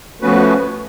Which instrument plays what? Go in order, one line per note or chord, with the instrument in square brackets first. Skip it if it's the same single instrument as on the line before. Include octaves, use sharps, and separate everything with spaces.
[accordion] F3 B3 F#4 B4 [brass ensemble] A3 C#4